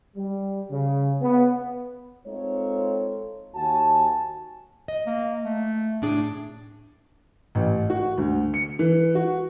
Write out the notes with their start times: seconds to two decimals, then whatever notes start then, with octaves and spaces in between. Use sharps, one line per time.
0.17 G3
0.71 C#3
1.21 B3
2.26 G#3 C4 D#4 F4 A4 C#5
3.55 D#2 F#4 G#5 A5
4.88 D#5
5.07 A#3
5.45 A3
6.02 A2 D4 G#4
7.55 A1
7.90 F#4
8.18 D2
8.54 C#7
8.79 E3
9.15 F#4